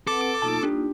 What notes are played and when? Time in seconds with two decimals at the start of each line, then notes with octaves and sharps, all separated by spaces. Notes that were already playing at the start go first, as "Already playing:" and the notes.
0.07 C4 A4 B4 F#5 D6
0.42 B1 A#3 D#4 F4 A5
0.63 D4 G4